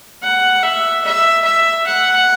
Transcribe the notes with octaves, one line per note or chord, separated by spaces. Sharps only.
F#5
E5
E5
E5
F#5